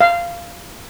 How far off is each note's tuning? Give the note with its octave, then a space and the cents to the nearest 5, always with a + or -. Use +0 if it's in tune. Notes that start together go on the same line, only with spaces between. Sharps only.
F5 -15